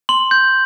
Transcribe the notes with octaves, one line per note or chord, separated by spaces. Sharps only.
C6 F#7
G6